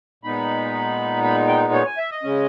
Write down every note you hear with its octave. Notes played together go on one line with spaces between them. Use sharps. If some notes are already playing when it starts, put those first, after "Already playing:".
A#2 G#3 B3 D#4 B5
B5
G5
C#5
G#5
E5
D#5
C#3 G#3 C#4